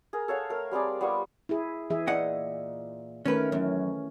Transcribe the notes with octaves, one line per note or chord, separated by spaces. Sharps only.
G#4 A#4
A4 C#5 F5 F#5
A3 A#4
G3 C4 G#4 D5
G3 B3 F4 C#6
E4 G#4
E3 G#4 E5
A#2 D#5 F#5
D#3 A3 C#4 A#4 B4
F#2 E3 C#4